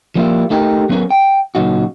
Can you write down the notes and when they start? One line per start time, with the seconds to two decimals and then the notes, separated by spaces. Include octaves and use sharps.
0.15 F3 G3 A#3 B3 E4 F4
0.50 A3 D#4 G4 A#4
0.89 F#3 B3 C#4 G#4 A#4
1.10 G5
1.55 A#2 C#3 F#3 D#4 F#4